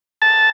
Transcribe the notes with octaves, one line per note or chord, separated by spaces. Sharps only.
A5